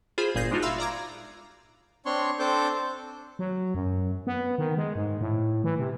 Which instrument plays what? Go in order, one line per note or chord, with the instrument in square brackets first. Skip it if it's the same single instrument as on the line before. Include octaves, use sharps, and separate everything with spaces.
[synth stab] F4 G#4 C5 B5
G1 A#2 G#4 G6 A#6 C7
G#3 D4 D#4 F4 F#4
E5 F5 B5 C6 E6 F6
D5 A#5 D6 G#6
[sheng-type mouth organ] C4 D4 C#5 C6 C#6
C4 D4 A4 C5 D6 G6
[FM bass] F#3
F#2
B3
D#3
G#3
G#2
A2
E3
C3